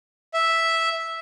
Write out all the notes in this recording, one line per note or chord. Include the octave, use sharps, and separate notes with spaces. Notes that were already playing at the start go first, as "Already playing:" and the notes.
E5